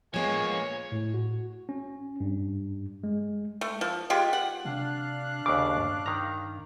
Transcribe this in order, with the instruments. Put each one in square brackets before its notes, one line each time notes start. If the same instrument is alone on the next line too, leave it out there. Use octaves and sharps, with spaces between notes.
[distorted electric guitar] F3 A#3 [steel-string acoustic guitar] G#3 B3 [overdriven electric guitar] C#5 [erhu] G#5
[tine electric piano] A2
F#4
C#4
G2
G#3
[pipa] A3
F3
G#3 F4 G4
F#5
[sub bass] C3 [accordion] D4 F5 F#6
[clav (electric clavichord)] D#2 C#3 [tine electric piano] D6
[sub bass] G2
[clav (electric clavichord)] D#3 A#5